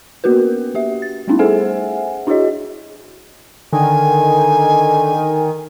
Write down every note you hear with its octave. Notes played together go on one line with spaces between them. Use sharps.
A#3 B3 F#4 A#4 B4
A#3 G4 E5
A6
G3 A3 B3 C#4 D#4 E4
G#4 A4 C5 E5 F#5 G#5
D4 E4 F#4 G#4 C#5 D#5
D3 D#3 G#5